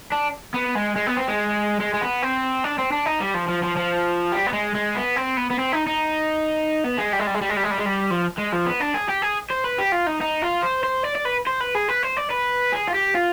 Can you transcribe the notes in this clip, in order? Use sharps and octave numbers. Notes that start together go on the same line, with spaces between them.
D4
B3
G#3
G#3
B3
C4
G#3
G#3
G#3
B3
C4
D4
C4
D4
D#4
G3
F3
F3
F3
F3
G3
B3
G#3
G#3
B3
C4
B3
B3
C4
D#4
D#4
B3
G#3
G3
G#3
G3
G#3
G3
G#3
G3
G#3
G3
G#3
G3
F3
G#3
F3
B3
D4
G#4
G4
G#4
C5
B4
G4
F4
D#4
D#4
F4
C5
C5
D5
D5
B4
C5
B4
G#4
B4
C5
D5
B4
G#4
F4
G4
F4